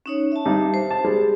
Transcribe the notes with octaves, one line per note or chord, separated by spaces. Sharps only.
C#4 D#4 C#5
E5 A5
G2 D#4
C5
A5
G3 G#3